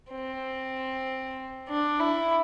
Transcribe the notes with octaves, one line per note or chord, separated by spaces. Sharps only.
C4
D4
E4